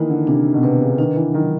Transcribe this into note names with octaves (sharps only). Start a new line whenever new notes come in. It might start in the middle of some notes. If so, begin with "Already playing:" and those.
Already playing: D#3 E3 A#3 D#4
D3
C3 D4
B2
C3 B4
C#3
D#3 D4
E3
D#3 F#3